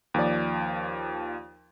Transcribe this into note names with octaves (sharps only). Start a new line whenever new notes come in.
D#2 F3 D5